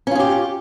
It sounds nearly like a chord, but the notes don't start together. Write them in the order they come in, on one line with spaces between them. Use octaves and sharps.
C#4 F4 G#4 G4